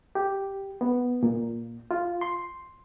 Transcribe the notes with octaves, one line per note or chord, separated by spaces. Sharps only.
G4
B3
A#2
F4
C6